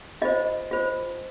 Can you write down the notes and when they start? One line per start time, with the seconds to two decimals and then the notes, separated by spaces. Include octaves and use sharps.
0.22 F4 C5 D#5
0.71 F4 C5